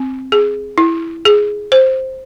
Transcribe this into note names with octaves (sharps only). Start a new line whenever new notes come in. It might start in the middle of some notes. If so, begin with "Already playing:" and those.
Already playing: C4
G#4
E4
G#4
C5